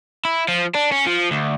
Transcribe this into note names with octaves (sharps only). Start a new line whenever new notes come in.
E4
F3
D4
C#4
F3
D2